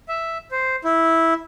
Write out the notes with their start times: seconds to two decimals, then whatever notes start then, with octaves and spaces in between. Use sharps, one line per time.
0.09 E5
0.52 C5
0.84 E4